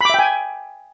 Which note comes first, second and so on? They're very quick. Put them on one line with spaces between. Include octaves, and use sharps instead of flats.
B5 D6 E5 G5 G#5